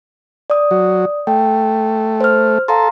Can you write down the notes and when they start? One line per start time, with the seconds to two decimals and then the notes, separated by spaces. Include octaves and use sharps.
0.50 D5 D#6
0.71 F#3
1.27 A3 G5
2.21 C5 F6
2.68 A4 F5 A#5 C6